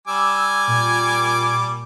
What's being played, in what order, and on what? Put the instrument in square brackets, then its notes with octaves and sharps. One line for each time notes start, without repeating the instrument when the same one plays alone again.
[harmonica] G3 G#5 D6 [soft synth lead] E6
[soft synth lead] A#2